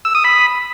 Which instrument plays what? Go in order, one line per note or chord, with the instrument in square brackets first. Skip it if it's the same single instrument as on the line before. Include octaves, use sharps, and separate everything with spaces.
[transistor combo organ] E6
D#6
B5